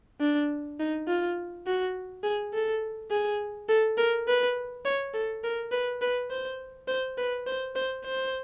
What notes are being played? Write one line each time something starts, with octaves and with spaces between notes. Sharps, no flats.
D4
D#4
F4
F#4
G#4
A4
G#4
A4
A#4
B4
C#5
A4
A#4
B4
B4
C5
C5
B4
C5
C5
C5